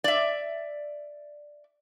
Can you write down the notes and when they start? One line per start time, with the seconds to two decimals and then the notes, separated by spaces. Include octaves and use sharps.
0.04 D5 E5